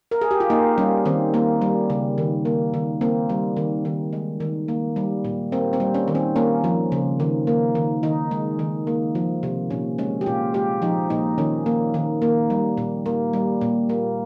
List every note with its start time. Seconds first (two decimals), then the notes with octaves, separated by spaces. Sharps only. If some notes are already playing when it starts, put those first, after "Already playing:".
0.11 A#4
0.21 G#4
0.31 G4
0.40 F4
0.50 A#3 D#4
0.78 G3 C#4
1.06 D#3 C4
1.34 A#3
1.62 G3
1.90 C#3
2.18 D#3
2.45 A#3
2.74 D#3
3.01 A#3 C4
3.29 G3
3.57 D#3
3.85 D#3
4.13 G#3
4.40 D#3
4.68 A#3
4.96 G3
5.25 A#2
5.52 A#3 C4
5.73 C4
5.80 G3
5.94 C#4
6.08 D#3
6.15 C4
6.36 A#3 C#4
6.64 F3
6.92 C#3
7.20 D#3
7.47 A#3
7.75 D#3
8.03 D#3 D#4
8.31 G#3
8.59 D#3
8.87 A#3
9.15 F3
9.43 C3
9.70 A#2 C#4
9.98 G#3 C#4
10.21 G4
10.26 A#2 F4
10.54 G#3 G4
10.82 F3 D#4
11.10 A#2 D#4
11.38 D#3 C#4
11.66 A#3
11.94 D#3
12.22 A#3
12.50 G3
12.77 A#2
13.06 A#3
13.33 G3
13.61 A#2
13.89 A#3